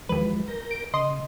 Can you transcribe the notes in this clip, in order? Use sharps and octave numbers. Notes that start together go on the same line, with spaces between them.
D#2 E3 F3 G#3 B4
A#4 G6 A#6
D7
C#3 D#5 C6